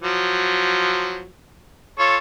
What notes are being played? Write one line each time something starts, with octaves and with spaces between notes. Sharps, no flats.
F3 F#3
F4 A4 C#5